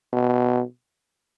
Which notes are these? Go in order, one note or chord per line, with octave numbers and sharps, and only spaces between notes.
B2